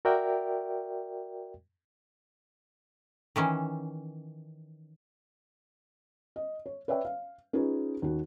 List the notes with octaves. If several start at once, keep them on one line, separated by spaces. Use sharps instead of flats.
F#4 A#4 D5 E5 G5
D#3 E3 C#4
D#5
C#5
B4 C#5 D5 E5 G5
F5
C#4 D#4 F4 G#4 B4
D#2 F#4